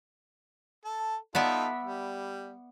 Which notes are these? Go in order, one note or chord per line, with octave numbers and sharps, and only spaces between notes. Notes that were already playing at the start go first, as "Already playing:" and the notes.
A4 A5
B3 D#4 F4 A4 D5 E5
G3